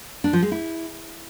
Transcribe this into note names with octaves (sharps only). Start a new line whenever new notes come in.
D4
F3
G#3
E4